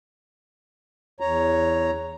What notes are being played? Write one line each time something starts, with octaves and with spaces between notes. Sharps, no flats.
E2 C#5 A#5